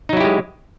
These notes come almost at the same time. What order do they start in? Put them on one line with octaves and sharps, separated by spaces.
D#4 F#3 E4 G4 G#3